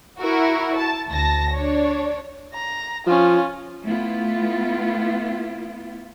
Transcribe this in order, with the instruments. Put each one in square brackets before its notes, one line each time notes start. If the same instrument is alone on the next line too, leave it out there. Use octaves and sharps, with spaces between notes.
[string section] E4 F#4 A#4
A5
D2 A5 A#6
D4 C#5
[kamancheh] A#5
[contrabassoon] F3 [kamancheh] C#4 F4
[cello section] A3 B3 E4 F4